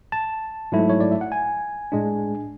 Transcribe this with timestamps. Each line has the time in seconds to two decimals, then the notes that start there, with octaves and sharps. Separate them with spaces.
0.12 A5
0.72 G#2 F#3 A3 E4
0.90 C#5
1.00 D5
1.11 E5
1.21 F#5
1.32 G#5
1.92 A2 G#3 D4